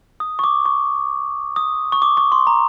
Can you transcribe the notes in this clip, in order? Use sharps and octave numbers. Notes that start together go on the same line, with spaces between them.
D#6
C#6
D6
C#6
D#6
C#6
D6
C#6
C6
A#5